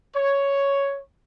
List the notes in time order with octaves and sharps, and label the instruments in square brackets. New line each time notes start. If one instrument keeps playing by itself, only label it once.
[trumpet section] C#5